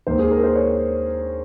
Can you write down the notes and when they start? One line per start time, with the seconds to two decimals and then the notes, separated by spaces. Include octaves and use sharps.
0.07 D#2 D#3 A#3 C5
0.19 G#4
0.31 A#4
0.44 C5
0.56 C#5